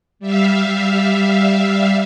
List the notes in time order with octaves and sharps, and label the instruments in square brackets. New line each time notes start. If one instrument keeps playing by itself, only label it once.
[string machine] G3 E5 F5